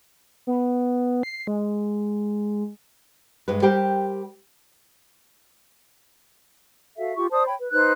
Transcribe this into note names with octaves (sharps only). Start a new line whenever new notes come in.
B3
C7
G#3
G2 G#3 B4
G3 G4 A#4 C5 G5
F#4 A4 E5 F5
F4 G4 C#6
C5 D5 A5 D#6
C#5 G5 B5
B4
D#4 B4 C5 F#6